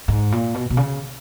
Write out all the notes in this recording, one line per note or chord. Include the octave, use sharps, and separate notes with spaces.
G#2
A#2
B2
B2
C#3